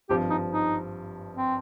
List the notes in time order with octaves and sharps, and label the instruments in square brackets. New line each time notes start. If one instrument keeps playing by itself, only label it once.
[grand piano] G#1 G2 F3 [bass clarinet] G4
[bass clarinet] D#4
D#4
C4